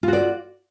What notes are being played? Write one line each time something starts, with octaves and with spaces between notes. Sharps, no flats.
F4 F#4 D5